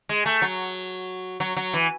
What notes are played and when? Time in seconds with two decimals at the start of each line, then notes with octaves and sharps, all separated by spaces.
0.09 G#3
0.26 A3
0.42 F#3
1.40 F#3
1.57 F#3
1.73 E3